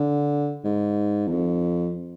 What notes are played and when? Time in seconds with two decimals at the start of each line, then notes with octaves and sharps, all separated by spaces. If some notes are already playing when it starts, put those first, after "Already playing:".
Already playing: D3
0.64 G#2
1.27 E2
1.31 F2